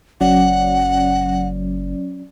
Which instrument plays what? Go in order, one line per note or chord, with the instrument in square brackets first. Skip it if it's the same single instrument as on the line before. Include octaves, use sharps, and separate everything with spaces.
[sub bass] F#1 [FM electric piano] F#3 C#4 D5 [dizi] F#5